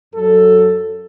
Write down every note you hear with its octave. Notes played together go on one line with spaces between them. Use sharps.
F#2 F#3 A4